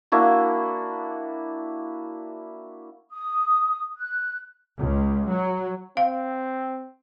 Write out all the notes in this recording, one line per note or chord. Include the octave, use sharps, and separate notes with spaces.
A#3 D4 E4 F#4
D#6
F#6
C#2
F#3
C4 F5